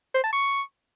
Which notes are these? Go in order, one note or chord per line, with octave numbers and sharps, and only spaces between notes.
C5
A5
C#6